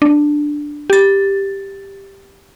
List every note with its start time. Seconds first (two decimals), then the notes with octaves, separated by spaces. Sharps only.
0.02 D4
0.90 G4 A6